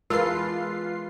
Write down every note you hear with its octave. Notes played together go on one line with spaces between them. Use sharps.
E3 G#3 D4 D#4 F4 A#4 B4 C7